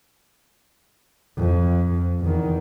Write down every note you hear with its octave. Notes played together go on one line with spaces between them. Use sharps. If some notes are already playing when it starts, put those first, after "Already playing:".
F2
E2 D#3